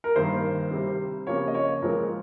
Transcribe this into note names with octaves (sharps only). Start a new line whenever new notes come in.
A#4
G2 D#3 A#3 C5
C3 G3 C4
C#3 F3 A#3 C#5
D#5
C#5
A#2 F3 G#3 C4 A#4